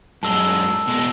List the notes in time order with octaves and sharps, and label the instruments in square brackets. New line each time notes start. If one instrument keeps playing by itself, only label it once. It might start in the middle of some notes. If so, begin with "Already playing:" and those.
[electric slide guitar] F#2 G#3 [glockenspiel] A5 E6 G7
[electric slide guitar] B2 G#3